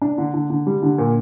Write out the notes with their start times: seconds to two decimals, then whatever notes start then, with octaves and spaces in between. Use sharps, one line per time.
0.02 D4
0.18 D3
0.34 D3
0.50 D3
0.67 G3
0.82 D3
0.98 A#2